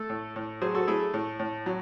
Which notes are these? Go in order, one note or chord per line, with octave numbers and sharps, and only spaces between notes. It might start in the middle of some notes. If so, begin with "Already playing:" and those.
Already playing: A3 A4
A2
A2
F#3 G#4 C5
F#4 A4
A3 E4 G#4
A2
A2
F#3